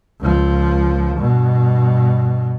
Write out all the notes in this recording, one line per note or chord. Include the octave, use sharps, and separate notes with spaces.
C#2 F3
G2 B2